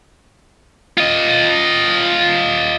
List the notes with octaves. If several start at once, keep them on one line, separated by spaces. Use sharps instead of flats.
F4 D#5